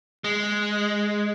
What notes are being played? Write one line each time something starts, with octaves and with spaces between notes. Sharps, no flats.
G#3